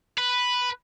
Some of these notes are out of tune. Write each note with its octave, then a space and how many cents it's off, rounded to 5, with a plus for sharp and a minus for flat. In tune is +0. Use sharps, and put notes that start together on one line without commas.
B4 +0